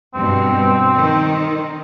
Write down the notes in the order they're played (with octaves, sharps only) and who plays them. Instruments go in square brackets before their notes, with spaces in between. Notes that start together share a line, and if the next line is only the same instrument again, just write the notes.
[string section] G2 B2 [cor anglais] C4
[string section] D#3